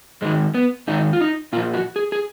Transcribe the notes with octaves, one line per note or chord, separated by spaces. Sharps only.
G#2 D#3 G#3
B3
G#2 D#3 D#4
F4
D#4
A#2 F3 F4
F#4
G#4
G#4